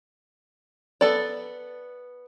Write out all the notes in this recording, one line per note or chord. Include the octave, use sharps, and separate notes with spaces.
B3 A4 D5